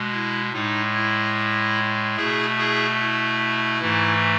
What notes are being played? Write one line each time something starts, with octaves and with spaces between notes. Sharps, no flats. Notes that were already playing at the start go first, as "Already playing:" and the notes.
Already playing: B2 G#3
E4
A2 G#3 D#4
E4
B2 A3 E4 G#4
E4 G#4
E4
G#2 E3 A3